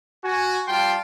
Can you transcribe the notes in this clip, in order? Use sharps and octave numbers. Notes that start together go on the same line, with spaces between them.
F#4 G#5
G3 F4 F5 G5 A5 C6